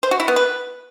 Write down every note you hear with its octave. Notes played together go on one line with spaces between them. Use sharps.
C5
F#4
E4
B3
B4